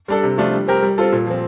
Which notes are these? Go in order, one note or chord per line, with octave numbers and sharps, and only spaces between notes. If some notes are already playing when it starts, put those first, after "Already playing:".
G3 D4 A4
C3
F3 A3 D4 F4
G3
C4 G4 A#4
G3
C4 F4 A4
A#2
F3 C4